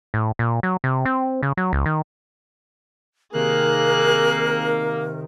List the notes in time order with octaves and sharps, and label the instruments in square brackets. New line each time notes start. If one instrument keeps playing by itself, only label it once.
[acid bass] A2
A#2
F#3
C3
C4
C#3
F#3
C#2
D#3
[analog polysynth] C3 D#3 [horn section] A#3 [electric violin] G#4 F#6 [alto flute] A#4